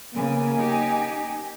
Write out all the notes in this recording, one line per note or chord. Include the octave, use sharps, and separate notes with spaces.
C#3 A#3 B3 G#5
D#4 G4